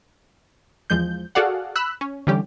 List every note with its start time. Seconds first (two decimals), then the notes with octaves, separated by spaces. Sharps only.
0.90 E2 F3 G#3 G6
1.35 F#4 G#4 A4 D5 F5 F#5
1.76 B5 E6 F#6
2.01 C#4
2.27 D3 E3 G3 C#4 G4